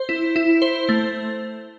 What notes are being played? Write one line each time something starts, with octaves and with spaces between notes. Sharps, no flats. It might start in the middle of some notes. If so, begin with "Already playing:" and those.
Already playing: C5
E4
E4
C5
A3